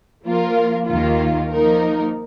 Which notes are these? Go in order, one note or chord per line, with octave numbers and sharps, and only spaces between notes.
F3 A#3 F4 A#4
D#2 D#3 A#3 F4
F3 A#3 D#4 A#4